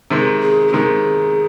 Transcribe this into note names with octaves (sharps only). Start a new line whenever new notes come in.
C3 D#3 G#3
G#4
G4
C3 D#3 G#3 G#4